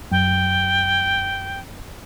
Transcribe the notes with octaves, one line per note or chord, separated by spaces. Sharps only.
F#2 G5